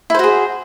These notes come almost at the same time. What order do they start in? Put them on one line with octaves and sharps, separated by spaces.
E4 C5 F#4 G#4